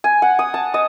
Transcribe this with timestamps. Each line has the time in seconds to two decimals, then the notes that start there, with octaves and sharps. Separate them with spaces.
0.04 G#5
0.22 F#5
0.39 D#6
0.54 A5
0.74 D#5